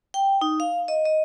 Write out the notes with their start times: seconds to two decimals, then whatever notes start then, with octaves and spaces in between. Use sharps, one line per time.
0.14 G5
0.41 D#4
0.60 F5
0.88 D#5
1.05 D#5